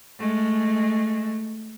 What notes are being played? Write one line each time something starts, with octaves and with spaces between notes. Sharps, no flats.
G#3 A3